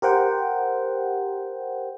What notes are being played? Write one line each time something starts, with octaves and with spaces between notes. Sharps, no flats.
G4 A#4 C5 F#5 G5